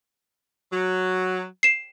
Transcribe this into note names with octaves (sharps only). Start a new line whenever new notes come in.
F#3
C7 E7